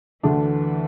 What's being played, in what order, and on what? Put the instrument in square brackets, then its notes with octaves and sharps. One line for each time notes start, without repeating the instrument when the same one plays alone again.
[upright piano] D2 D3 A3 D4 [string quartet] E3